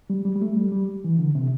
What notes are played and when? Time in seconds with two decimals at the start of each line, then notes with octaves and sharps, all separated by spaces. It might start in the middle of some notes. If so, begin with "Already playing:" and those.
0.10 G3
0.25 G3
0.35 G3
0.41 A3
0.56 G3
0.72 G3
1.04 E3
1.19 D3
1.35 C3